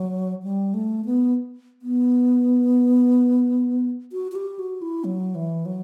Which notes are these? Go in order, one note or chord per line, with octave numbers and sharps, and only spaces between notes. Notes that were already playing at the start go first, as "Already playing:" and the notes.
Already playing: F#3
G3
A3
B3
B3
F#4
F#4
G4
F#4
E4
F#3
E3
F#3